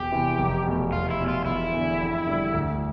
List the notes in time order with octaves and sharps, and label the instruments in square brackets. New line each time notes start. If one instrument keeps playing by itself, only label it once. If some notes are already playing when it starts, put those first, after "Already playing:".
Already playing: [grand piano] E1 [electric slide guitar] G4
[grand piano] E2 C3 E3
F1
E2 B2 A3
[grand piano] F1 [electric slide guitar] F4
[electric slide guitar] E4
[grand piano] E2 B2
[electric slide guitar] F4
[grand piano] E1 [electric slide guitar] E4
[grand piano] E2 D3
F2
D3 G3
D2